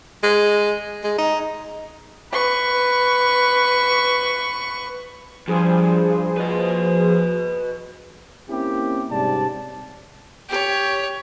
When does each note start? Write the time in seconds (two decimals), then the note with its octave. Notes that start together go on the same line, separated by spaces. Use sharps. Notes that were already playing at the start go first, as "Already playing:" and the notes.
0.23 G#3
1.04 G#3
1.18 D#4
2.33 B4 C#6
5.48 G2 F3 G#4 C5
6.37 B4 D#5
8.49 A#3 C4 C#4 E4 G4
9.10 G#2 C3 G3 C#4 D5 A5
10.49 G4 C#5